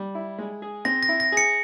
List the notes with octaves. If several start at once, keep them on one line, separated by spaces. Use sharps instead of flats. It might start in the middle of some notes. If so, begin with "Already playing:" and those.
Already playing: G3
E4
G#3
G#4
C4 A#6
A#6
E4
A#6
G#4
C#7